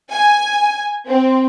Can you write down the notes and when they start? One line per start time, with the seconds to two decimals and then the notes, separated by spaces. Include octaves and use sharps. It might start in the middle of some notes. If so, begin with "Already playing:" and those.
0.12 G#5
1.07 C4